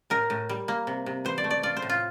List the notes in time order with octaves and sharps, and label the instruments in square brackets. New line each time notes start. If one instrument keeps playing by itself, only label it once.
[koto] A2 A#4
A2
G3
A#3
C3
C3
E3 C5
D5
A3
D5
F4 D5
C5
A2
F4